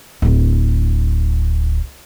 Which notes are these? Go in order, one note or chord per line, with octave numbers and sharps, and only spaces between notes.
D1 E4